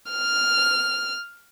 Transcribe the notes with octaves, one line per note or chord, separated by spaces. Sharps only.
F6